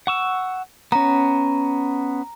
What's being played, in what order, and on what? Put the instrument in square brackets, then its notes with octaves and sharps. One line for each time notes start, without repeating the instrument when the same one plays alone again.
[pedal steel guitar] F#5 C#6 E6
[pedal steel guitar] B3 C#4 [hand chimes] A#5